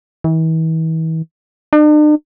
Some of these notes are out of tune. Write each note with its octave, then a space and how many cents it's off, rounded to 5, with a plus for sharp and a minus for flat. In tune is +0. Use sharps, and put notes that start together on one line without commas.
E3 -40
D4 +45